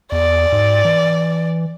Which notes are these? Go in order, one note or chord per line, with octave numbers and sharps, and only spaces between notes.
E2 D5
G#2
E3